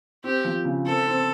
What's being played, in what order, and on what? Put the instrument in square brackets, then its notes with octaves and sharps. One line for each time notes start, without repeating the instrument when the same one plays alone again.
[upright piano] C4 [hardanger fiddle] G4
[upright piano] F3
C#3
[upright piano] C4 [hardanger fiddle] A4
[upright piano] C4